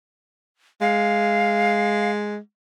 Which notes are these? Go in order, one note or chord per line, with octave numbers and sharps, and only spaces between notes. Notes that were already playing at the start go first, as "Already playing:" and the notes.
G#3 F5